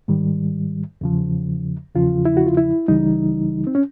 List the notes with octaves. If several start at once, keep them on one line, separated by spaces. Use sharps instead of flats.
G#2 D#3 G3
E2 C#3 F3
E2 C#3 F3 F4
E4
F#4
F4
E4
C#2 C#3 E3 G3 D#4
C4
C#4